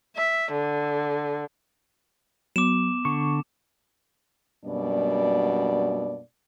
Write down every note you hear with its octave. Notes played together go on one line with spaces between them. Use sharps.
E5
D3
F#3 B3 D6 E7
D3 C#6
F#2 B2 G3 A#3 D4 D5